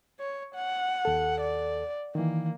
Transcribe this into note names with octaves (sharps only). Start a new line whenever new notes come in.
C#5
F#5
D#2 A4
D5
D#3 E3 A#3